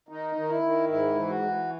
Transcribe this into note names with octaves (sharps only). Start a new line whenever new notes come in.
D#3 D#4
D#3
E4
D#3
G#2 E4
E3
F#4
E3